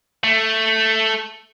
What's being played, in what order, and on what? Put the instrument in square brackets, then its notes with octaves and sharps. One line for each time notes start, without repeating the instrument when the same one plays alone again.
[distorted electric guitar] A3